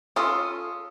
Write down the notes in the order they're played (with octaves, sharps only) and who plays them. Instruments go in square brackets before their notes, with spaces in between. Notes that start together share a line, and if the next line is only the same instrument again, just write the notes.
[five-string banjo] C#4 F4 [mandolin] A4 C6 D#6